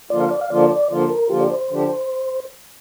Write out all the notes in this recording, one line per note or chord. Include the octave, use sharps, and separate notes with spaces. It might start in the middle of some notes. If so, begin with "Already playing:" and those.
D3 F3 A#3 F4 D5
F5
D5
F5
D3 F3 A#3 F4 D5
D5
D3 F3 A#3 F4
A#4
D3 F3 A#3 F4 G4
D5
C5
D3 F3 D4 G4